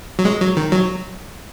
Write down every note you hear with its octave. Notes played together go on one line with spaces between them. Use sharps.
F#3
G#3
F#3
D#3
F#3